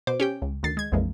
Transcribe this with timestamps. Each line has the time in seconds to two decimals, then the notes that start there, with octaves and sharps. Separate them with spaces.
0.07 B2 C5 D6
0.20 C#4 G4 G5
0.42 C#2
0.63 D2 D#3 A6 C7
0.77 G#3 G#6
0.92 A#1 F2 E3 G#3 A#3